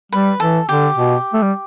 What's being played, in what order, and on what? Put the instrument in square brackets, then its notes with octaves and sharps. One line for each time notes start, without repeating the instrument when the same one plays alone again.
[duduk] G3 [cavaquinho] B4
[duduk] E3 [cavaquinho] A4
[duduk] D3 [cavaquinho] G4
[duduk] B2
A3
G3